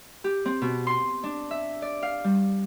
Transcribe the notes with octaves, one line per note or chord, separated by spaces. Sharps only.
G4
C4
B2
C6
D4
E5
D5
F5
G3